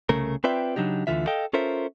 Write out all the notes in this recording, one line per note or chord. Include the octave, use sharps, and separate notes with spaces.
C2 C#3 A3 A#4
C4 F4 B4 D5 E5 G5
C#3 F#3 D4 D#4 G4
D2 G#2 D3 E3 F4 E5
A4 D#5 F5 G5
C#4 F4 A4 A#4 C5 E5